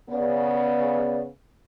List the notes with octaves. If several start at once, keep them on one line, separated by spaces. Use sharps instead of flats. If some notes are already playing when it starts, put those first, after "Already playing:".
C#3 B3 D5